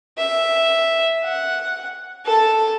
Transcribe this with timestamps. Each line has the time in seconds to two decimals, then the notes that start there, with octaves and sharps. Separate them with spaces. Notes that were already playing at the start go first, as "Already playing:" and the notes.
0.18 E5
1.24 F#5
2.26 A4 A5